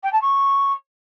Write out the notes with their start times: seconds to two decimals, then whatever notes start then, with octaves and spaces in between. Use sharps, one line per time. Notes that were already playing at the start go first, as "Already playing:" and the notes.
0.03 G5
0.13 A5
0.22 C#6